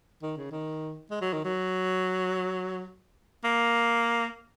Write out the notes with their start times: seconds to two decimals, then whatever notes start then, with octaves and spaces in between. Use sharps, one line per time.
0.23 D#3
0.37 C#3
0.52 D#3
1.11 G#3
1.22 F#3
1.33 D#3
1.45 F#3
3.44 A#3